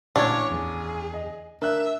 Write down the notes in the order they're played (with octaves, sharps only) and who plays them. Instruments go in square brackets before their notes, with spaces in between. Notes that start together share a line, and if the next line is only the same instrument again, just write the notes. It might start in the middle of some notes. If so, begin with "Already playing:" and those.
[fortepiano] A1 A5 [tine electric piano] A#2 G#6 [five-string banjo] D4 [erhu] C#5
[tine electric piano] E2 E3 [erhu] G#4
[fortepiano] D#5
[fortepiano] D4 F#6 [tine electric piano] A#4 [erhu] E5